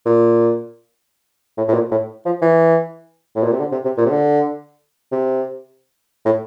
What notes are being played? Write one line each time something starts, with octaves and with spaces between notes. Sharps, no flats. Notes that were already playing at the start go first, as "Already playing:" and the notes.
A#2
A2
A2
A#2
A2
F3
E3
A2
A#2
C3
D3
C3
C3
A#2
C3
D3
C3
A2